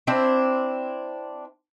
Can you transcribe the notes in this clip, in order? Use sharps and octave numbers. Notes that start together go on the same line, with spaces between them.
C4 D4 E4 C5